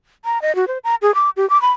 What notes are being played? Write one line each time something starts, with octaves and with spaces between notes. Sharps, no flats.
A#5
D#5
F#4
C5
A#5
G#4
D6
G4
D6
B5